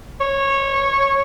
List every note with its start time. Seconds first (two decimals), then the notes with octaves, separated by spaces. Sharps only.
0.20 C#5